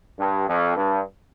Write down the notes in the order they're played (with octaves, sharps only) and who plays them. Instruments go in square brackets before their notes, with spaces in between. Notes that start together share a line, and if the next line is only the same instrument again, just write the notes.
[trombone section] G2
F2
G2